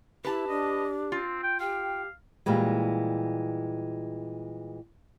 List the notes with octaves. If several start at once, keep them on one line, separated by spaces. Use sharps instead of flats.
E4 G4 B4 A5
D4 D#5
C4 F4
G5
G4 F5 G5
A#2 E3 G3 G#3